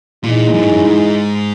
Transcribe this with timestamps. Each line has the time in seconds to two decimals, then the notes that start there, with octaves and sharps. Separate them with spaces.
0.23 A#2 E3 G#3 D#4
0.54 F#2
0.63 G#2
0.71 F#2
0.85 G#2